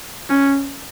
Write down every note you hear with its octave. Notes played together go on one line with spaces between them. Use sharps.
C#4